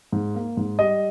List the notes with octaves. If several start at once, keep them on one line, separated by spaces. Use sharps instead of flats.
G#2
A#3
G#2
G3 D#5